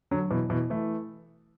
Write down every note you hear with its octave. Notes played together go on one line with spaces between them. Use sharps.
D3 F#3
B2 E3
B2 E3
E3 A3